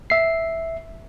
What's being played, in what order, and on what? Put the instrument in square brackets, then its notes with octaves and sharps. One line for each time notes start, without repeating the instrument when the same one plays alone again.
[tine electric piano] E5 C7